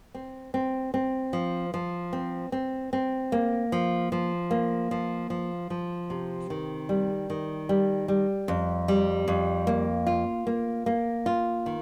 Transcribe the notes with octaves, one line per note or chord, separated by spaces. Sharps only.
C4
C4
C4
F3
F3
C4
C4
C4
A#3
F3
F3
A#3
F3
F3
F3
C3
D#3
G3
D#3
G3
G3
F2
G3
F2
A#3
F4
A#3
A#3
F4
D#3